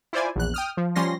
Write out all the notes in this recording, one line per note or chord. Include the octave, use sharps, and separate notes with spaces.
E4 F4 C5 D5 G#5
A#1 E2 F#6
G5 D#6 F6
F3
F3 G3 C#4 C6 A#6